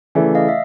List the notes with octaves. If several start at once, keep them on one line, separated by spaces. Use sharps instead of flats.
C#3 E3 A3 D5 E5
D#5 F5
E5